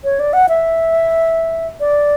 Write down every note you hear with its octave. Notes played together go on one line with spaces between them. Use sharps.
C#5
D5
F#5
E5
D5